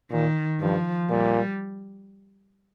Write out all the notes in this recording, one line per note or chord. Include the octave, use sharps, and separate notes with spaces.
A#2 D#3
G2 F3
A#2 G3